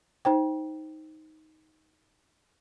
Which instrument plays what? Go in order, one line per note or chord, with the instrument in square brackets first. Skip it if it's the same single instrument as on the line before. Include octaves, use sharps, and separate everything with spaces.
[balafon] D#4 C5 G5